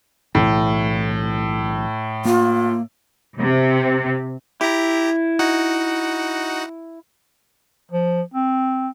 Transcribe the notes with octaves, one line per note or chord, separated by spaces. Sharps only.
B1 A2 E3
A#3 F4
C3
E4 G4 A#5
D#4 F#4 F#5
F3
C4